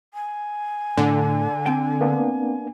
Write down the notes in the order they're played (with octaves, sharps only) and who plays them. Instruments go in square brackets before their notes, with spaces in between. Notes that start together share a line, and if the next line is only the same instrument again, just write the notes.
[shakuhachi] G#5
[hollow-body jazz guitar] A2 [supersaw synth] D3
[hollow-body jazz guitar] C4 G5
[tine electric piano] A#3 B3 D4